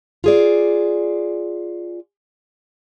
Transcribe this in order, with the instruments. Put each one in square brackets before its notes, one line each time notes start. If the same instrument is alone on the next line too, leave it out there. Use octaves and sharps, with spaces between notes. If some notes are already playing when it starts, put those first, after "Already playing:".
[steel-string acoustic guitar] F4 G#4 D5